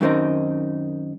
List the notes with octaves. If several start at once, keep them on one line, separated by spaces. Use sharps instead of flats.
F#2 D#3 A3 C4 D#4